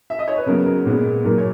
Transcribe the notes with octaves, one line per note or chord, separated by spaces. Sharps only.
E5
D#5
C#5
B4
C#3 F#3 B3 A#4
A#4
A#2 G#3 B3
A#2 F#3 A#3 A#4
C#5